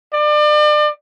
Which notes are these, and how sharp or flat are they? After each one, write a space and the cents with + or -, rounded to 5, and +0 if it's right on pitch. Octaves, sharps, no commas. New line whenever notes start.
D5 +35